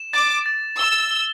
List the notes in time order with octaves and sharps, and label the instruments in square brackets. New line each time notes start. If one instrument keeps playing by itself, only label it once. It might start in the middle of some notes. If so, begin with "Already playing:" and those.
Already playing: [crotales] E7
[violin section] D6 [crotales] A6
[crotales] A6
[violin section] E6 [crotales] G7
[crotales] G7